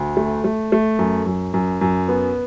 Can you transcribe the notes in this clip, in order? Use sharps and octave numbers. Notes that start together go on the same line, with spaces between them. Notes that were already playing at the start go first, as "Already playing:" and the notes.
Already playing: D2
A3
A3
A3
F#2
F#2
F#2
F#2
B3